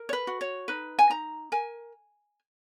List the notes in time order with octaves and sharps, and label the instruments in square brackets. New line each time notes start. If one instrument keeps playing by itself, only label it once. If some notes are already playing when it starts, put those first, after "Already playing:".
Already playing: [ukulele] A#4
C#5
B4
F#4
C#5
D#4 B4
G#5
D#4 A#5
A#4 G#5